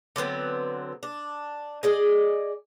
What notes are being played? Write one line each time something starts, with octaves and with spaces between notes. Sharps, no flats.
D3 F#3 B3 C4
D4
G#4 D5 D#5